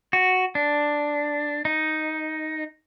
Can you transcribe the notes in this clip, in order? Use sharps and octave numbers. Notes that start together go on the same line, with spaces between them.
F#4
D4
D#4